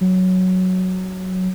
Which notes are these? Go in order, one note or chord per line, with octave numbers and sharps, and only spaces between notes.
F#3